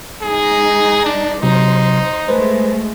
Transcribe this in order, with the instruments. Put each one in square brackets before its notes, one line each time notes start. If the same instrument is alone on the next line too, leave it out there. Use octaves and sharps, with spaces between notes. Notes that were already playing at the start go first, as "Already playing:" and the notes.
[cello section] G#3 D#4 [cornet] G#4
[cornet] D4
[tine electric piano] C3 F#3 [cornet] D#4 [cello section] C5
[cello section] G#3 A3 [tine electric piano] B4 C5